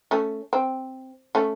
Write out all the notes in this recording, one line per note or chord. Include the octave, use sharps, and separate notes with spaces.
A3 C#4
C4
A3 C#4